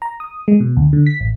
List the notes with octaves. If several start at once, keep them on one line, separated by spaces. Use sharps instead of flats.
A#5
D#6
G#3
B2
D2
D3
B6
A1